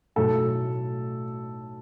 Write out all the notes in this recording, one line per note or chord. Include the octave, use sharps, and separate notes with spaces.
B1 A2 F#3 A3 A4